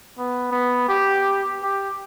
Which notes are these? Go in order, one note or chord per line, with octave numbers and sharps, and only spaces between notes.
B3
B3
G4
G4